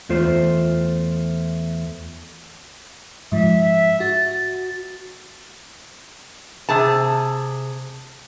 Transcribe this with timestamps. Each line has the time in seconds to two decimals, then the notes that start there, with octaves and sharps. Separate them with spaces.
0.09 E2 A3 F4 C5
3.32 G#2 F3 E5
4.00 F#4 A6
6.69 C3 G#4 A5